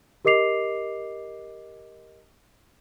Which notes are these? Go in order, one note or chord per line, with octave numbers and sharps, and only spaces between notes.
G4 A#4 D#5 D6 C7 F7